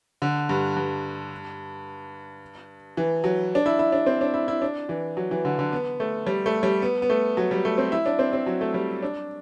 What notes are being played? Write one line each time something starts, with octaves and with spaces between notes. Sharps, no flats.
D3
G2
G2
E3
F#3
D4
E4
E4
D4
C4
D4
E4
E4
D4
E3
F#3
E3
D3
D3
B3
A3
G3
A3
G3
B3
B3
A3
F#3
G3
A3
C4
E4
D4
C4
C4
F#3
A3
G3
D4